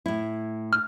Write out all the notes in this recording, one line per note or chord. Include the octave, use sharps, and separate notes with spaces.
A2 E4
F6